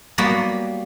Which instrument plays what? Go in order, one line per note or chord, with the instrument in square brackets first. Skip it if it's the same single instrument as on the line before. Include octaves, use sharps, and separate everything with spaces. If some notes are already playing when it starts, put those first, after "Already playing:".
[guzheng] F#3 G3 A#3 B3 F#4 G4